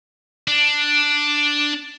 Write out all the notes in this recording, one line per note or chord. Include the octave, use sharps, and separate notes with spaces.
D4